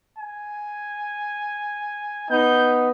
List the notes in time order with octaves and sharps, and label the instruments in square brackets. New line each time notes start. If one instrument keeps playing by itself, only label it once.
[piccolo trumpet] G#5
[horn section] B3 D#4 [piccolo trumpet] G6